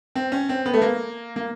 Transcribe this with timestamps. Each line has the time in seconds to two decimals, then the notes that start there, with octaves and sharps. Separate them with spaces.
0.15 C4
0.32 C#4
0.49 C4
0.66 B3
0.74 A3
0.82 A#3
1.36 A#3